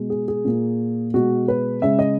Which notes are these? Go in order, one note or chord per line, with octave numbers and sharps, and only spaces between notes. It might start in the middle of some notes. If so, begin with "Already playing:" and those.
Already playing: B2 G#3
G#4
G#4
A#2 A#3
B2 G#3 F#4
B4
C#3 G#3 E5
D#5